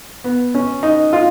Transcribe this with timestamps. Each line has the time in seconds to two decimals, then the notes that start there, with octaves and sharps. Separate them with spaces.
0.24 B3
0.55 C#4
0.83 D#4
1.13 F4